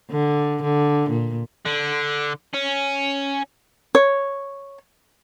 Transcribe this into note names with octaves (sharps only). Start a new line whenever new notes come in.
D3
D3
A#2
D3
C#4
C#5